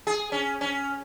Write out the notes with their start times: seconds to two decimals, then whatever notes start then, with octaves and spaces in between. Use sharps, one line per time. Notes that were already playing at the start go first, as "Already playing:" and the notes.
0.07 G#4
0.32 C#4
0.61 C#4